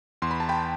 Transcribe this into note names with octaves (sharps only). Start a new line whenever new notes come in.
E2 C6
B5
A5
G5 B5